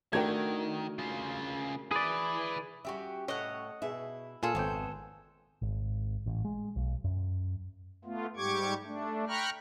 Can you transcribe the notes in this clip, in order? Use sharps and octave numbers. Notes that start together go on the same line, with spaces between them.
D#3 A3 D4 F#4 A#4 G5 G#6
C#3 F4
E4 G#4 B4 D5
G3 C#4 F#4 G4 E5
A2 C#5 D#5 F#5
B2 E4 G#4 E5
A#2 F4 G#4 A4
G#1 F2 B3 C5 C#5 G5
G#1
A1
G#3
B1
F#2
A3 B3 F4
G#2 G3 G4 C#6 D6 G#6
A3 D4
G5 A#5 B5 C#6 F6 F#6